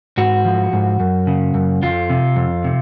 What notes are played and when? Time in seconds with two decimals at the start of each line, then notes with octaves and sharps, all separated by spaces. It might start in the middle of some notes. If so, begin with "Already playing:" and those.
0.18 G#2 F#4
0.45 F3
0.73 G#2
1.00 F#2
1.27 C#3
1.54 F#2
1.82 F2 F4
2.10 C3
2.36 F2
2.64 C3